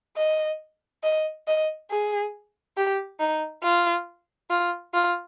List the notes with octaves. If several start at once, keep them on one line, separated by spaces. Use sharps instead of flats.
D#5
D#5
D#5
G#4
G4
D#4
F4
F4
F4